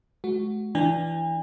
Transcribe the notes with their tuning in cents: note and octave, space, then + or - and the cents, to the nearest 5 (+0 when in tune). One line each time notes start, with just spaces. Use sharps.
G#3 +40 F#4 +0
E3 +0 D4 +0 G#5 -40